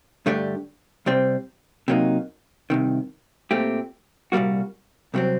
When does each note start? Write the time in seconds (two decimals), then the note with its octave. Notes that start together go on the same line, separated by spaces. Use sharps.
0.26 G2 D3 A3 D4 G4
1.06 C2 C3 G3 C4
1.88 C3 F#3 A#3 D#4
2.70 C2 C3 D#3
3.51 A#2 A3 C4 G4
4.32 C2 A#2 G3 A#3 F#4
5.14 C2 C3 F#3 C4